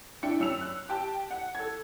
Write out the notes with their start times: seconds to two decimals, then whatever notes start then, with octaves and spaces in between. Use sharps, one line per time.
0.23 D4 E4 G5 C#7
0.40 F#2 E6 C#7 F7
0.61 F#6
0.89 G4 G5 A5
1.31 F#5
1.55 A4 G#6